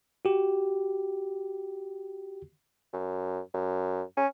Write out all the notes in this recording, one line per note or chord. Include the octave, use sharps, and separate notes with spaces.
F#4 G4
F#2
F#2
C#4